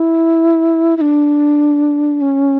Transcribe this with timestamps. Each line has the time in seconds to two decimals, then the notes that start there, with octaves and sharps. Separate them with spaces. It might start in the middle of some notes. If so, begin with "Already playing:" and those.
Already playing: E4
0.97 E4
1.01 D4
2.21 C#4